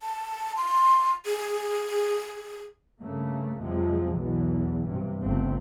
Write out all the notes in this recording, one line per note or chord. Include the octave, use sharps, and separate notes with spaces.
A5
C6
G#4
G2 C#3 A3 A#3
F2 C3 F3 F#3 G#3
B1 E2 B2 E3
G2 C3
G1 C#2 G2 C3 A3 C4